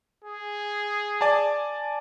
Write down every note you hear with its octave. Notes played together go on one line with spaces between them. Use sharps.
G#4
D5 G#5 A5